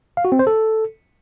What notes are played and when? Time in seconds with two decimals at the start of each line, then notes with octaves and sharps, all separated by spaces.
0.17 F5
0.25 F#4
0.32 C4
0.39 C5
0.47 A4